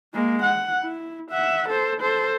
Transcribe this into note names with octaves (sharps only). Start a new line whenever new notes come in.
G#3 A#3
F#5
E4
E5 F#5
A4 C5
A4 C5